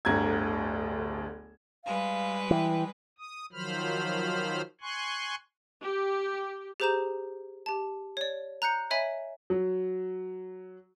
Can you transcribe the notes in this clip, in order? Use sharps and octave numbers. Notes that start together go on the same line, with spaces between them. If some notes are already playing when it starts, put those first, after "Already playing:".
D1 G1 D2 A#5 G#6
G3 G#3 B4 F5
E3 G5
D#6
D#3 F3 F#3 C5 B5 F6
G#5 C6 C#6 F#6
G4
G4 G#4 C5 A#5 G6 E7
G4 A5
C#5 D5
A#5 F#6 G6 C#7
C#5 D#5 E5 G#5 B5
F#3